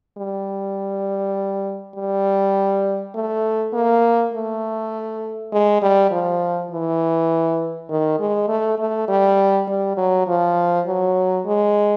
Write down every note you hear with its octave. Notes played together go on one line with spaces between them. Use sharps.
G3
G3
A3
A#3
A3
G#3
G3
F3
E3
D#3
G#3
A3
A3
G3
G3
F#3
F3
F#3
G#3